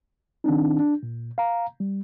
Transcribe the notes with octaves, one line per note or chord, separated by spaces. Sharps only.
D#3 C4 D4 D#4
D4
A#2
F5 A#5
G3